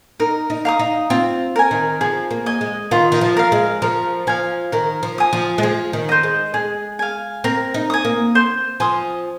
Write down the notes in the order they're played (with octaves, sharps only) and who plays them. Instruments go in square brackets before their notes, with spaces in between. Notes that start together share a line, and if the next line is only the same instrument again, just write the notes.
[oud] D#4 [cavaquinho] A#4
[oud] D#4
[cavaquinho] F5 A#5 D#6
[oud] D#4
[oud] C4 [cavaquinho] F4
[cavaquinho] A#4 G#5
[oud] D#3
[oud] F3 [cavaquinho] G#4
[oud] A#3
[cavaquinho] D#5 G#5
[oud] G#3
[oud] D#3 [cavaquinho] F4
[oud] D#3
F3
[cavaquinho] A#4 F5
[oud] G#3
[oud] F3 [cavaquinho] A#4
[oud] F3 [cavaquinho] F5 G#5
[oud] D#3 [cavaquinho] A#4
[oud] F3
[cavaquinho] G#5 D#6
[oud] F3
G#3
[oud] F3 [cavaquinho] G#4
[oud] D#3
[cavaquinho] C5 D#5
[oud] G#3
[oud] G#3 [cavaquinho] G#4
[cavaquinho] F5 G#5
[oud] C4 [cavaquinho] A#4
[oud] D#4
[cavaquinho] G#5 D#6
[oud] A#3
[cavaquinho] C5
[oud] F3 [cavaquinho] G#5 C6 D#6